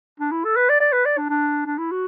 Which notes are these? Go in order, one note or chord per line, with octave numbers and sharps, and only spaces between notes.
D4
E4
A4
B4
D5
D5
B4
D5
D4
D4
D4
E4
F#4